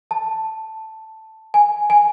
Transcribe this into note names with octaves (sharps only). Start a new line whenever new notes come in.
A5
G#5
G#5